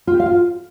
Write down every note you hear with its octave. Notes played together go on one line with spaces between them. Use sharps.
F4
G4
F5
F4